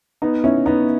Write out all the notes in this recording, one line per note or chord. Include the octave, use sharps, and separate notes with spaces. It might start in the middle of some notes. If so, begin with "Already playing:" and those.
B3 D#4
C#4 E4
B3 D#4